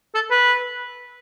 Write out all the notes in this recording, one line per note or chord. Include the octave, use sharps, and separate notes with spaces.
A4
B4